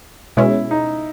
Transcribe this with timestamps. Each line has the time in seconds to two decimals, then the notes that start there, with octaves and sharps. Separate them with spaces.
0.37 B2 G#3 C#4 E4
0.71 D#4